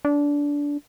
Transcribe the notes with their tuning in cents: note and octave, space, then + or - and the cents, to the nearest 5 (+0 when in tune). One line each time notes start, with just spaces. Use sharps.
D4 -20